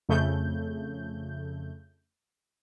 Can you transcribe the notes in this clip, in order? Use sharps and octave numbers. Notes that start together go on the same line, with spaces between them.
F2 C#3 A3 G6